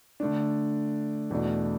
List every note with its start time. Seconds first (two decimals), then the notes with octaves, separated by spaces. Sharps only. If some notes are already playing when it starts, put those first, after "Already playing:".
0.20 D3 A3 D4
1.31 E2 B2 A3 D4